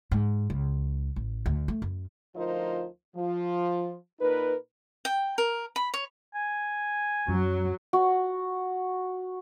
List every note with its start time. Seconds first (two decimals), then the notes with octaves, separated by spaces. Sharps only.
0.11 G#2
0.50 C#2
1.16 A1
1.46 D2
1.68 A3
1.82 F#2
2.35 D2 F3 D#4 F4 A#4 C5
3.16 F3 F4
4.20 A#2 D#4 A#4 B4
5.05 G5
5.38 A#4
5.76 B5
5.94 C#5
6.35 G#5
7.28 F#2 F#3
7.93 F#4